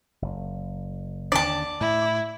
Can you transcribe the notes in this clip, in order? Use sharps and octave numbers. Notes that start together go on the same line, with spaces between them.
F#1
D#2 D3 D4 D5 A5
A2 E4